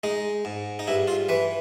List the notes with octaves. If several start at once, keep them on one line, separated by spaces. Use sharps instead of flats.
G#3 D#4
G#2
D#4
G2 E4
F4
E3 B4